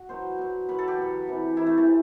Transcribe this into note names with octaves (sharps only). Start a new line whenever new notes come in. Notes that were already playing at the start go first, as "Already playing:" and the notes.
Already playing: F#4
B2 F#3 C5
B2 F#3
B2 F#3 B4
A4
G4
B2 F#3
C3 E3
C3 E3 E4
A3
A3
C3